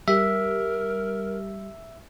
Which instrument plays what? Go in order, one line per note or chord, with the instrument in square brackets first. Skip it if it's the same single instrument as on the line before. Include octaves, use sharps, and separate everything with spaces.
[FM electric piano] G3 G4 [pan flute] A#4 [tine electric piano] E5